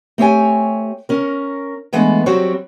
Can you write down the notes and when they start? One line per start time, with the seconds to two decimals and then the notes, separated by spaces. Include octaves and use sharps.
0.18 A3 C4 G4 C#5 G#5
1.09 C#4 A#4
1.93 E3 G#3 A3 B3 D4
2.26 F#3 G3 C4 F#4 C#5